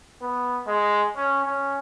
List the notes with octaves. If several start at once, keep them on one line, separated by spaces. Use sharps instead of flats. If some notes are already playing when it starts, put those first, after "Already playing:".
B3
G#3
C#4
C#4